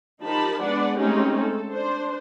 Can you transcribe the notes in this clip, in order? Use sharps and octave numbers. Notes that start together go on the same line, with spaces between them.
F3 D#4 G4 A#4 A5 B5
G#3 B3 D4 B4 D5 F#5
G#3 A3 C4 C#4 D#4 G4
A4
D4 C5